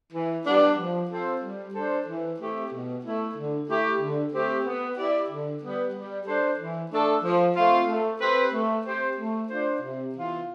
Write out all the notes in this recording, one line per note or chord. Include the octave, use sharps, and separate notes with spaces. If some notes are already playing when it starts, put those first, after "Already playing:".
E3
G3 B3 D4
F3
C4 F4 A4 C5
G3
D4 A4 C5
E3
A3 C4 E4 G4
B2
A3 E4
D3
A3 E4 G4
D3
A3 C4 G4
B3
E4 G4 D5
D3
G3 B3
G3
D4 A4 C5
E3
A3 D4 A4 D5
F3
A3 C4 F4
A3
C4 G4 B4
A3
C4 G4 C5
A3
D4 F4 C5
C3
E3 B3 F4